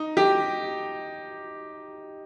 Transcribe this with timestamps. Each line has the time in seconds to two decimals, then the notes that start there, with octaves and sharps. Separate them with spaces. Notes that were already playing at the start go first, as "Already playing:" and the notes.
Already playing: D#4
0.17 G4